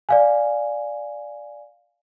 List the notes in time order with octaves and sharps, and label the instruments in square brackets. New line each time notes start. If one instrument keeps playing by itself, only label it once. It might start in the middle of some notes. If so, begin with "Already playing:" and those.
[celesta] D5 F5 G#5